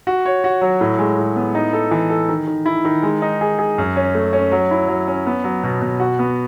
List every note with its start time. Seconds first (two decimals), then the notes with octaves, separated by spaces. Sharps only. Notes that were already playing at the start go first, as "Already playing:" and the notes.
0.07 F#4
0.25 C#5
0.44 F#4
0.61 F#3
0.81 A2
0.99 G#3
1.18 A2
1.36 B3
1.55 D#4
1.73 A4
1.91 E3
2.10 A4
2.29 D#3
2.47 D#3
2.66 E4
2.85 D#3
3.03 G#3
3.22 D#4
3.41 G#4
3.59 G#4
3.78 F#2
3.96 C#4
4.15 A3
4.33 C#4
4.52 F#3
4.71 E4
4.88 F#3
5.08 C#4
5.27 B3
5.44 F#3
5.63 B2
5.82 B2
6.00 F#4
6.19 B3